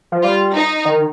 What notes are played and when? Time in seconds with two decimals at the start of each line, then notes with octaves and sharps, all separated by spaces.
0.12 F3
0.23 G3 F4
0.55 D#4
0.85 D#3